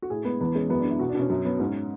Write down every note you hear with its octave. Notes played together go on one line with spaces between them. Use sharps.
F#4
A2 G#4
G#3 B3
E2 B3
G#3 C#4
F#2 B3
D4
G#3 E4
B2 F#4
D4
B2 C#4
F#2 C#4
F#3 B3
G#2 C#4